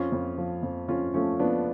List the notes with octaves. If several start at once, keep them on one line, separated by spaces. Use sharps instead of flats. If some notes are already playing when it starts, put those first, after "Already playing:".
Already playing: F2 C#4 F4
F2
F3
F2
F2 C#4 F4
F3 A3 C#4
F3 B3 D4